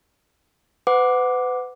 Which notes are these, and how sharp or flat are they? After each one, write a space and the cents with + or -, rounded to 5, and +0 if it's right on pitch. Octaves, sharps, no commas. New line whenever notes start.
B4 +40 F#5 -10 D6 +0